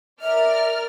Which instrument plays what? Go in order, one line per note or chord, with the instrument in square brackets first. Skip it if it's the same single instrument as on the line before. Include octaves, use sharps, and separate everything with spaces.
[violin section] A#4 D5 F6 [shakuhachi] E5